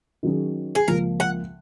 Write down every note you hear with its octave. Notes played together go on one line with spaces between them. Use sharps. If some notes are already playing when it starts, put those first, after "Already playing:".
D#3 F#3 C#4 G#4
G#4
C#2 C#3 F3 A#3 A#4
F#5